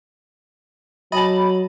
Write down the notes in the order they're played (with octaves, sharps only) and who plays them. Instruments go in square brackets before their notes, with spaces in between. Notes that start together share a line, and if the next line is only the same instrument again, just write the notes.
[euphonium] F#3 [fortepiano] D#5 A5 [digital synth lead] B5